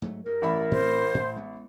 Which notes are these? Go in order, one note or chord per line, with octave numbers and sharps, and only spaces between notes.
G#2 F#3 A3
G2 A#4
A1 D5 E5 B5
A2 C4 C5
A2
G#3 B3